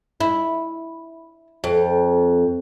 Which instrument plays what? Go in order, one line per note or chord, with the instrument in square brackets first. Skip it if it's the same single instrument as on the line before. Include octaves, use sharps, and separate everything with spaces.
[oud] E4
F2